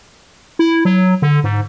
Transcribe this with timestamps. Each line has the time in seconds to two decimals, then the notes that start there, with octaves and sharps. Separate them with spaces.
0.59 E4
0.85 F#3
1.22 D3
1.44 G#2